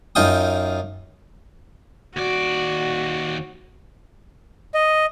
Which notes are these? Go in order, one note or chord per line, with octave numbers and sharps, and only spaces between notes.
F#2 D#4 F4 G5 D#6
D#2 F#4 D5
D#5